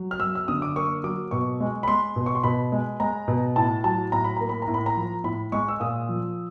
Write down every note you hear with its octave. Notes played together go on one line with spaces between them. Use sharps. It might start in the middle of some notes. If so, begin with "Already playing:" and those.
Already playing: F#3
F6
F#2 E6
E6
D3 D#6
D6
A#3 C#6
F#3 D6
B2 C#6
G#3
B5
G#3 C6
B2
C#6
C6
B2 B5
G#3
G#3 A#5
B2
A2 A5
F#3 A5
A2 A#5
B5
A#3 A#5
B5
A#5
A2
B5
A#5
F3
A2 B5
G#3 C#6
E6
A#2 D#6
F3